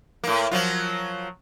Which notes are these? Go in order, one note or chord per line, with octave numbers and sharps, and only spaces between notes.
A2 A#3
F3 F#3 F4